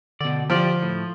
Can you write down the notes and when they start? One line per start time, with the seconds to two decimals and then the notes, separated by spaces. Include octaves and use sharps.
0.21 B2 D3 D5
0.50 F3 G4 D5
0.83 A2